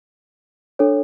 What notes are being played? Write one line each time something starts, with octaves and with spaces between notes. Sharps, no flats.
D4 A4 C#5